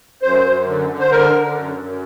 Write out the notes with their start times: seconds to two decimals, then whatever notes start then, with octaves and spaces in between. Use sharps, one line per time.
0.22 F#2 C5
0.45 F#2
0.67 D3
0.89 D3
0.99 C5
1.10 D3 A#4
1.33 D3
1.55 F#2
1.77 F#2